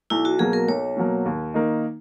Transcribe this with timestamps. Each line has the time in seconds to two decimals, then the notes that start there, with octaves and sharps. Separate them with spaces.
0.10 B1 E4
0.25 F#4
0.39 B2 F#3 A#3 G#4
0.53 A#4
0.68 B1 C#5
0.97 B2 F#3 A#3
1.25 D#2
1.54 D#3 A#3 D#4